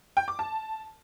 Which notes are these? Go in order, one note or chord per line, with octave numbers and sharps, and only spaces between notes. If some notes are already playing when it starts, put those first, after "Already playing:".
G5
D6
A5